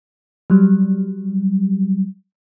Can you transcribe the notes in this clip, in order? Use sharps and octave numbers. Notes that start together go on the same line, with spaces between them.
F#3 G3